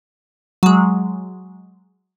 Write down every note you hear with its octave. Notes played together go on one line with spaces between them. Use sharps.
F#3 G#3